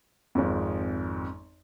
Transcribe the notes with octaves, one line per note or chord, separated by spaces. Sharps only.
G#1 F2